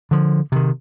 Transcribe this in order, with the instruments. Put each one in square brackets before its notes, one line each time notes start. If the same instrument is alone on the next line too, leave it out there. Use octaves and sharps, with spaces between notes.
[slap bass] D3 F3
C3 D#3